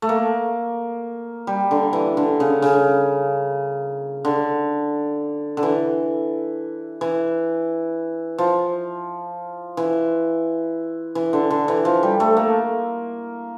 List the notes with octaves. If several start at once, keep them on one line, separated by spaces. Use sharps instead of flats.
A3
A#3
G3
D3
E3
D3
C#3
C#3
D3
D3
E3
E3
F3
E3
E3
D3
D3
E3
F3
G3
A3
A#3